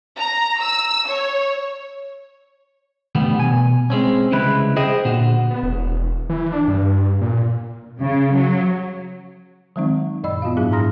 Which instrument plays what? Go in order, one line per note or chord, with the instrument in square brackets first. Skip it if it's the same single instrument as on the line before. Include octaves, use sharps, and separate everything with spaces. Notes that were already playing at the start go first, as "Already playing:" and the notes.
[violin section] A#5
E6
C#5
[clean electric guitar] D3 E3 G3 A3 B3
B2 G#5
G#3 C4 C#4
C2 C#3 E3 G#3 E4 B4
G#4 C5 D#5 E5 G5
A#2 D3 F#4
[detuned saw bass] B3
E1
E3
D4
G2
A#2
[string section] C#3
F#3
[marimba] D#3 F3 F#3 G#3 C4 D#4
F#2 A#2 D5 D#5 B5 E6
B3 F4 F#4 F5
G#2 F#3 D4 E4 G#4
A#5 C6 D#6 F6 A#6